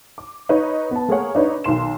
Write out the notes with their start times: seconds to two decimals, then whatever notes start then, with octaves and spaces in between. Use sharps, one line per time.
0.18 D6
0.49 D#4 B4 C#5
0.91 B3 A5
1.08 A3 A#3 G#4 A#4 C#5 F#5
1.35 D4 D#4 B4 C#5
1.64 B1 D#3 C6 E7